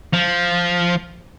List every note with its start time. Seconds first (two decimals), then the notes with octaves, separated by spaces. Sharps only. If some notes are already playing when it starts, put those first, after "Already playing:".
0.13 F3